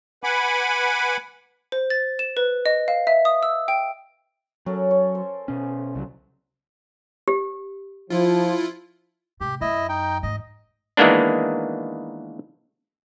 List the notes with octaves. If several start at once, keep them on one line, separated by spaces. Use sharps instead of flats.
B4 F#5 G#5 B5 D6
C5
A6
E7
B4
D#5
F5
E5
D#6
E6
G5
F#3 C#4 A4 A#4
C#5
C5
B2 C#4
C2 C#3 F#3
G4
F3 E4 F4
G#2 C3 G4
F#2 E4 D#5
D#4 G5
E2 G#2 D#5
D#3 E3 G#3 A#3 B3 D4